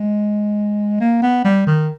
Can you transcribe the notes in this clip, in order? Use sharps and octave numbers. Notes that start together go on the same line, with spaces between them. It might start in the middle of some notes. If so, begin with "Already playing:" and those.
Already playing: G#3
A#3
B3
G3
D#3